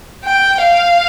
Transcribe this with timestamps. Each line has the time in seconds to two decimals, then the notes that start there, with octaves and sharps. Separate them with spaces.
0.24 G5
0.61 F5